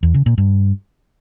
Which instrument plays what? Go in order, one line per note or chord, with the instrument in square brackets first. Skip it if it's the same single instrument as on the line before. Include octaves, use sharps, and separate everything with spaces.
[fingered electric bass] E2
C#3
A#2
G2